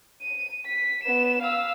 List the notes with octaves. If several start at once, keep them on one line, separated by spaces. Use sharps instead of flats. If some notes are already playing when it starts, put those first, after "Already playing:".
D#7
B6
B3 E7
F5 E6